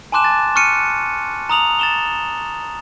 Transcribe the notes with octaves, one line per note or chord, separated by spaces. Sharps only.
G#5 A5 C6 D6 F#6 E7
A6
C#6 F6 F#6 C#7 D#7
A#5 D#6 F7 F#7
A6 E7 G7